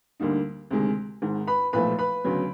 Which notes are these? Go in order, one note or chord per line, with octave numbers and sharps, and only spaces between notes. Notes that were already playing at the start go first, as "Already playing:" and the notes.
D2 D3 G3 A#3 D#4
D2 C3 D#3 G#3
G#1 G#2 D#3
B4 B5
B1 A#2 F3 A3 B4 B5
B4 B5
D2 C#3 F#3 B3